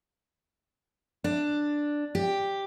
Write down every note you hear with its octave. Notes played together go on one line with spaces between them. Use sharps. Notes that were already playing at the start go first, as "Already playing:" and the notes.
D4
G4